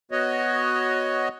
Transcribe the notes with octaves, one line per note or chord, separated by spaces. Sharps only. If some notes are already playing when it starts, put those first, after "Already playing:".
B3 F#4 C#5 D#5